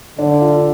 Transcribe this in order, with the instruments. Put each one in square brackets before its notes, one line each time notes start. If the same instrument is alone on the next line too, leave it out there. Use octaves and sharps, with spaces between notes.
[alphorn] D3 [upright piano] D4
[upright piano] F4